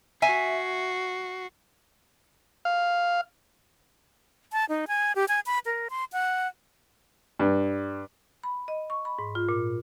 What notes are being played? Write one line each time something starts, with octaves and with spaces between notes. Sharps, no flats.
F#4 E5 G#5 C7
F5
A5
D#4
G#5
G4
G#5
B5
A#4
C6
F#5
G2
B5
D#5
C#6
B5
G#2
F4
A#2